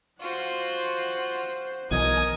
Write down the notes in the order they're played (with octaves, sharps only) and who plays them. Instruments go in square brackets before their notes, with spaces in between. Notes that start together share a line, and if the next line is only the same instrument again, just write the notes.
[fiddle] F4 F#4 [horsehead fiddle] C5 F#5
[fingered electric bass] B1 E3 F#3 [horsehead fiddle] A#4 [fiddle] D#5 G#5 [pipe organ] D#6 G#6